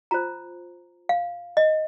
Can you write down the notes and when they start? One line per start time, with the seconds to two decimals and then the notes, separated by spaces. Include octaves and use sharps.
0.11 F4 C5 A#5
1.09 F5
1.57 D#5